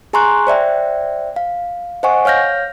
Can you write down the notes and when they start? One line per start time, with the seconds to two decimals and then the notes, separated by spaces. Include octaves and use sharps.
0.13 G#4 G#5 A#5 C6 C#6 F#6
0.47 C5 D5 E5 G5
1.36 F5
2.03 C5 D#5 F#5 G#5 C#6
2.25 C#5 F5 F6 G6 A#6